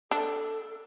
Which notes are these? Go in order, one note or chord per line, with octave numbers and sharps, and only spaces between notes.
D4 A4